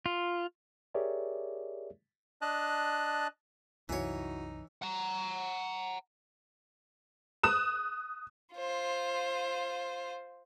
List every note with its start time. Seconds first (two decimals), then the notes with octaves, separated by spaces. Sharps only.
0.06 F4
0.94 G4 G#4 A#4 C#5 D5 E5
2.42 D4 D#5 A5 F#6
3.89 C2 F#2 E3 D#4 E4 F#4 C#5 C#7
4.82 F#5 A#5
7.43 D#6 F#6 E7
8.55 F4 C5